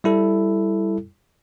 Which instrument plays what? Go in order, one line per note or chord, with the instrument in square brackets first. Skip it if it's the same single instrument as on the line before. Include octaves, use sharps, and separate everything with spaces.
[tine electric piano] G3 E4 A4